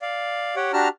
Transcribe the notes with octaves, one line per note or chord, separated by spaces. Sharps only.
D5 F5
G4 C#5 F#5 G5
D4 F#4 G4 A5 A#5 F6